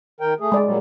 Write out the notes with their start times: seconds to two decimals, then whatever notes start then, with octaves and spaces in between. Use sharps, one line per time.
0.21 D#3 A#4 G5
0.40 A3 G#4
0.52 G#3 D5
0.65 A#2 F#3 G3